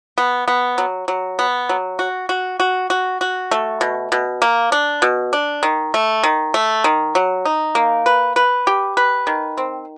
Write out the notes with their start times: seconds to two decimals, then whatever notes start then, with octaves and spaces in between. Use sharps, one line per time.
0.18 B3
0.48 B3
0.78 F#3
1.08 F#3
1.39 B3
1.69 F#3
1.99 F#4
2.29 F#4
2.60 F#4
2.90 F#4
3.21 F#4
3.51 A3
3.81 B2
4.12 B2
4.42 A#3
4.72 D4
5.02 B2
5.33 D4
5.63 D#3
5.94 A3
6.23 D#3
6.54 A3
6.84 D#3
7.15 F#3
7.45 D#4
7.75 A#3
8.06 B4
8.36 B4
8.67 G4
8.97 B4
9.27 D#3
9.57 C4